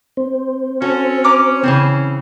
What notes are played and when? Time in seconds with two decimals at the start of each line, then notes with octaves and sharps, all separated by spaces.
0.17 C4
0.82 C#4 F#4 A4
1.24 A#5 D6 F6
1.63 C#3 E3 C4